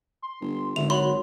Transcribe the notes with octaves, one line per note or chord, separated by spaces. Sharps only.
C6
G1
G#1 D3 E4 F7
F#3 B5 C6